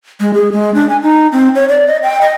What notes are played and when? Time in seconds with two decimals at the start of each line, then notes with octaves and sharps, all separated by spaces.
0.20 G#3
0.34 G#4
0.52 G#3
0.74 D4
0.89 G#5
1.02 D#4
1.32 C4
1.55 C#5
1.69 D5
1.87 D#5
2.03 G5
2.21 D#5